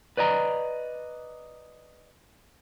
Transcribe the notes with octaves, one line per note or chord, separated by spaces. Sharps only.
B4 D5 D#5 A#5